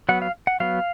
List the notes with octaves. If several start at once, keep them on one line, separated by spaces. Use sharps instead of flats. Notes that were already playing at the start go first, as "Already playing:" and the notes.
F#3 B3 F#5
F5
F#5
F#3 B3 F5